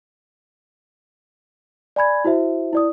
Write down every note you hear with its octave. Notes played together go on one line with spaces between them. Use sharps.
D5 G#5 B5 G#6
E4 F#4 C5 E5
E4 D5 D#6